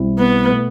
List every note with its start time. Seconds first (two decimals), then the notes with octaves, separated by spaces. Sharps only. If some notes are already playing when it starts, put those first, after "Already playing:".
Already playing: B1 B2 G3 C4 E4
0.19 B3
0.51 B2 A3